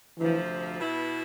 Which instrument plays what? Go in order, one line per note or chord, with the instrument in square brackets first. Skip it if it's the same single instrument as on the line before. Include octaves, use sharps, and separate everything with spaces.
[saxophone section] D2 C3 F3 [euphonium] E3
[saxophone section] B2 B3 E4